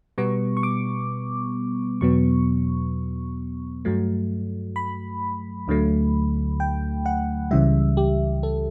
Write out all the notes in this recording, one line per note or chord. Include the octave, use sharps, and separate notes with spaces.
B2 G3 B3 C#6
C#6
D6
E2 B2 F#3 B3 C#6
G2 F#3 A3
B5
D2 D3 F#3 A3
G5
F#5
C#2 C#3 E3 G3 E5
G4
A4